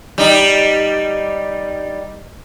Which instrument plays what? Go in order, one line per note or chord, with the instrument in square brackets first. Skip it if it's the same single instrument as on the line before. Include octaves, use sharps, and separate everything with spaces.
[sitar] G3 D#4